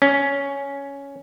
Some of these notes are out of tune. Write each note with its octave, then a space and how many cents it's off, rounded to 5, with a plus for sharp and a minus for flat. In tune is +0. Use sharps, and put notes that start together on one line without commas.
C#4 +10